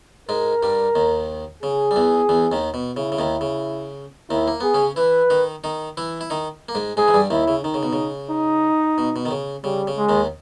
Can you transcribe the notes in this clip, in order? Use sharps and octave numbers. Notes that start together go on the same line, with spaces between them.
G#2 G#3 A#4
G2 G3
D#2 D#3
C#3 G#4
G3
E2 E3
E2 E3
D#2 D#3
B2
C#3 E4
C#3
D#2 D#3
C#3
D#2 D#3 E4
A#3
B3 G#4
C#3 C#4
E3 E4 B4
D#3 D#4
D#3 D#4
E3 E4
E4
D#3 D#4
A#3
G#2 G#3
G#2 G#3 G#4
E3
G2 G3
D#2 D#3 E4
C#3
D#3 D#4
C#3
B2
C#3
D#4
B2
B2
D#3
C#3
C#3 G3
C#3
G#3
D#2 D#3